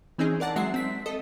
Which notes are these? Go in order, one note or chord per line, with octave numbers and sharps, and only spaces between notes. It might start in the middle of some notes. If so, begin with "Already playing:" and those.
E3 C4 C#4 D#4 G#4
A#4 D5 F#5 A5
F#3 G#3 E5 F#5 C7
C4 B6
A4 D#5